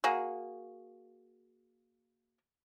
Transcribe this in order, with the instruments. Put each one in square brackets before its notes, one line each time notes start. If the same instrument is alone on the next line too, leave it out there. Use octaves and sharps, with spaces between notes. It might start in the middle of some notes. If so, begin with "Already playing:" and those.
[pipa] A#3 F#4 G#4